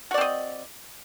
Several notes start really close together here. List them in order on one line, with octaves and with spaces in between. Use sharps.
F#4 D5 C4 D#5